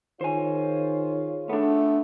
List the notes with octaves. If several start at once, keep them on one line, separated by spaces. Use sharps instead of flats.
D#3 F4 G#4 C5 C#5 G#5
A3 B3 D4